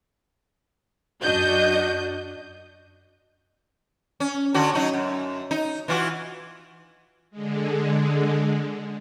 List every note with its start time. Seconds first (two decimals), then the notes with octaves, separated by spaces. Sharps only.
1.22 F#2 D4 F#4 D#5 G6
4.20 C#4
4.54 D3 C#4 F#4
4.74 F#3 D#4 F#4
4.94 F#2
5.51 D#4
5.88 E3 F4 F#4
7.31 D3 G#3